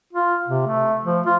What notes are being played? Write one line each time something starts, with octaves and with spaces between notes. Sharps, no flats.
F4
C3
A3
F3
F4